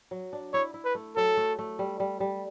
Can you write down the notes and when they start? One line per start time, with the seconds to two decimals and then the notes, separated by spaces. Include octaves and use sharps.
0.11 F#3
0.33 D4
0.54 E4 C#5
0.74 E4
0.85 B4
0.95 A3
1.16 F#3 A4
1.37 A3
1.59 A3
1.79 G3
2.00 G3
2.20 G3